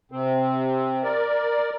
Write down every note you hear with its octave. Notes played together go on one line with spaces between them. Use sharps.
C3 C4
A#4 D5